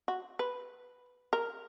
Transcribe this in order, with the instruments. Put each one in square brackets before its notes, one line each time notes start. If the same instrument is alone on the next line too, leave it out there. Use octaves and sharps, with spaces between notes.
[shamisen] F#4
B4
A#4